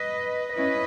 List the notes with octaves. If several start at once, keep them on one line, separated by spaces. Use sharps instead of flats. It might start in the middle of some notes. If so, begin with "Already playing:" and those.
Already playing: B4 D#5
C#4 E4 B4 D#5